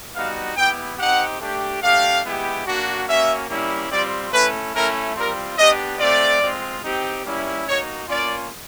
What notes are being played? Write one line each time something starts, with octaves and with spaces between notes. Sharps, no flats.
G3 B3 D#4 F#4 F5
B3 E4 G4 G5
C4 D#4 G4 F#5
A3 D4 G4
A3 D4 G4 F5
G#3 B3 E4 G4
A#3 D4 F#4
A#3 C#4 F#4 E5
G3 A#3 C#4 E4
G3 C4 F4 D5
A3 C#4 E4 B4
A3 C#4 E4 A#4
G3 C4 F4 A#4
B3 D4 G4 D#5
A3 C4 F4 D5
G#3 C4 F4
C4 D#4 G4
G3 A#3 C#4 E4
A#3 D#4 F#4 C#5
A#3 C#4 F4 D5